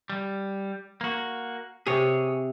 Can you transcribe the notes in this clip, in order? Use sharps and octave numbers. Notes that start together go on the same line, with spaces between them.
G3
A#3 F#4
C3 G#4 C#5